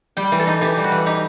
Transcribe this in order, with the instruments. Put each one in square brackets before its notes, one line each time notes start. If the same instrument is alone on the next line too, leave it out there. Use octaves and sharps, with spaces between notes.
[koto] G3 G5
E3
A4
D#4
E3 G4
G3
F#4
E3
D#4 G4